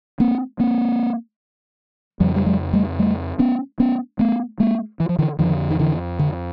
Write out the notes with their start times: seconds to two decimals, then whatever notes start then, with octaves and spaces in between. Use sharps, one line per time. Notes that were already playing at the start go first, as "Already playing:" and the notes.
0.20 A#3 C4
0.60 A#3 C4
2.20 F2 C#3 F3 G3
2.36 G3
2.46 F#3 G#3
2.73 G3 A3
2.99 G3 A3
3.39 B3 C#4
3.80 B3 C#4
4.19 A3 B3
4.60 G#3 A#3
5.00 E3
5.09 F3
5.19 D3 E3
5.39 F2 D3 D#3 F3
5.71 D#3
5.79 D3 E3
6.19 D3